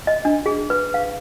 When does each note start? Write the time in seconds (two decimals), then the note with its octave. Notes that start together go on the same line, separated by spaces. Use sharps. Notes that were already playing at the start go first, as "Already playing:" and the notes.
0.07 D#5
0.25 D4
0.46 G#4
0.70 B4
0.94 F5